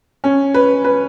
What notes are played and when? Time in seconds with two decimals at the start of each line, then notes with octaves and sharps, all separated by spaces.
0.24 C#4
0.54 B4
0.84 B4